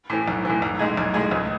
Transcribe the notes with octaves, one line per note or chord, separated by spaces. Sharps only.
A2 E3
B1
A2 E3
B1
A2 G#3 D#4 G#4
B1
A2 G#3 D#4 G#4
C#2